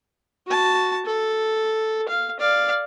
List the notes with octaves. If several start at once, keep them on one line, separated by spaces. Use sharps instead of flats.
F#4 A5
A4
F5
D5 F5